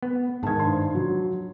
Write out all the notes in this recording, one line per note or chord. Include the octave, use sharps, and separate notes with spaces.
B3
G#2 D#3 A5 G#6
G2 C5 C6
F#3